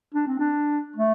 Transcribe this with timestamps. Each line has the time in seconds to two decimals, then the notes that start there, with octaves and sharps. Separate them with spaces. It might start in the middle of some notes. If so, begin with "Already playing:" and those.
0.14 D4
0.27 C4
0.39 D4
0.96 A3